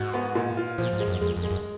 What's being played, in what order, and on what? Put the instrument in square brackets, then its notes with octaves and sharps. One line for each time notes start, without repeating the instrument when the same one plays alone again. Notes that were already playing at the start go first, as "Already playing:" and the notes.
Already playing: [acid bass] G#2 [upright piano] F#4
[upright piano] B3
A#2
F4
[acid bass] A#2 [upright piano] F3
[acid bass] G#2
[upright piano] G#3
[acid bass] F#2
[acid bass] F2 [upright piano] G#3
[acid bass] F2
[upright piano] G#3
[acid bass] F#2